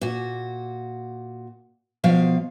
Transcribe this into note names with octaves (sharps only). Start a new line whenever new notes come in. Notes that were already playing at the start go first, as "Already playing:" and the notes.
A#2 F#4
B2 F3 F5